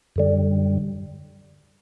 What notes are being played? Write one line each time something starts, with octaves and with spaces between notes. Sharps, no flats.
F#2 D3 G3